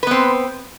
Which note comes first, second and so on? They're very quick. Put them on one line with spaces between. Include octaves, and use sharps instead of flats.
B4 B3 C4